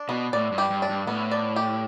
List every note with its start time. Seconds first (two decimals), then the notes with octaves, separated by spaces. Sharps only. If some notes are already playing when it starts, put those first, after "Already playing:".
Already playing: D4
0.09 B2 B3
0.33 A2 D5
0.52 G2
0.58 G4
0.70 G2
0.82 D4
0.90 G2
1.07 A2 B3
1.31 D5
1.56 G4